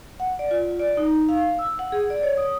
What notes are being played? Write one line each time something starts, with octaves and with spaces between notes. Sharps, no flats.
F#5
D5
F4
D5
D#4
F5
E6
F#5
G#4
D5
C#5
D#6